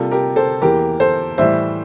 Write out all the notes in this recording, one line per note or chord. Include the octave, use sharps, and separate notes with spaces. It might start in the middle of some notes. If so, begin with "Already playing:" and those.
Already playing: C3 G3 A#3 F4 A4
G4 A#4
A4 C5
E2 E3 A#3 G4 A#4
A4 C5
A2 E3 G3 C5 E5